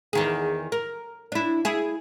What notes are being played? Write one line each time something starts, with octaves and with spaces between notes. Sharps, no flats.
E2 D#3 G#4
A#4
D4 E4
E4 G#4